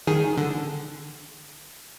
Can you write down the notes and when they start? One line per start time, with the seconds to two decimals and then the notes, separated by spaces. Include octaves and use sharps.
0.07 D#3 G#4
0.37 D3